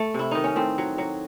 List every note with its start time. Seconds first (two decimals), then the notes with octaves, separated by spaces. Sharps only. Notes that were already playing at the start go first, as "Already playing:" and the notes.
Already playing: A3
0.14 C3 E4
0.31 D#3 D#4
0.44 C#4
0.56 A2 C4
0.78 F#3
0.98 F#3